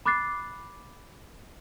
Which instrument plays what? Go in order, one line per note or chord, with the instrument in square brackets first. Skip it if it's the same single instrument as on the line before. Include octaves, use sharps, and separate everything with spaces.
[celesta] B5 D6 F#6 A6 C7